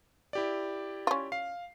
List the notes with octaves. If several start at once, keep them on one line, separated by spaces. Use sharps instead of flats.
E4 G4 D5
C#4 F4
F5 C7